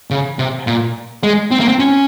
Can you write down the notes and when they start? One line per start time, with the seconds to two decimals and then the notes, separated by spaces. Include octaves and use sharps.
0.11 C#3
0.39 C3
0.67 A#2
1.23 G#3
1.51 C4
1.60 A#3
1.68 C4
1.79 C#4